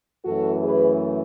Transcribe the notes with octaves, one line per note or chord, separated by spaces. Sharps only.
F#2 E3 A3 F#4 A4
G#4 B4